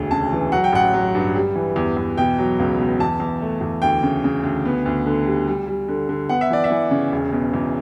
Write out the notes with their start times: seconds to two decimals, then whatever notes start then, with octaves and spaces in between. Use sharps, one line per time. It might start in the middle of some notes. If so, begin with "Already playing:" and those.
Already playing: E1 D2
0.11 C#3 A5
0.32 E3
0.52 F#3 F#5
0.64 G5
0.73 A1 F#5
0.94 F#3
1.15 G2
1.36 G3
1.56 E3
1.76 E2
1.97 E2
2.18 B2 G5
2.39 F#3
2.59 C#2
2.79 B2
3.00 E2 A5
3.20 E2
3.42 A3
3.61 E2
3.82 D2 G5
4.03 C#3
4.24 C#3
4.43 D2
4.65 B3
4.86 D2
5.06 D3
5.26 G3
5.47 G3
5.67 G3
5.88 D3
6.09 D3
6.29 B3 F#5
6.41 E5
6.50 E3 D5
6.64 E5
6.70 E3
6.91 C#3
7.12 E1
7.32 B2
7.54 E2